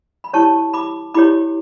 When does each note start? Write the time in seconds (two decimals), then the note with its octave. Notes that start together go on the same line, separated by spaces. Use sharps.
0.24 B5
0.33 E4 G4 C#5 A5 C#6
0.73 B5 D6
1.14 E4 G4 C#5 B5 D6